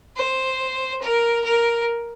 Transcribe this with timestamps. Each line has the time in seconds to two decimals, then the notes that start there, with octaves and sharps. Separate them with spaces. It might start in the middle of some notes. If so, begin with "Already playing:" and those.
0.16 C5
1.02 A#4
1.44 A#4